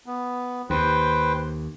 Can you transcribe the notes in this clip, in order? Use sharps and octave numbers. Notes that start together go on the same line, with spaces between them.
B3
D#2 B4 C5 G5